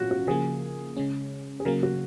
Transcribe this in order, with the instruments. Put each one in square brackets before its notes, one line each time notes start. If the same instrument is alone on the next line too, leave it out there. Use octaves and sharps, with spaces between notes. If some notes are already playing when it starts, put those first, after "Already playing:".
Already playing: [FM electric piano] A#2 F#3 C#4 F4 [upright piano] F#4
[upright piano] F#4
[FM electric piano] C#3 F3 A#3 [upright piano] G#4
[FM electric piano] C#3 G#3 C#4
[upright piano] G#4
[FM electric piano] C#3 F#3 A#3 [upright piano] A#4
[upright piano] F#4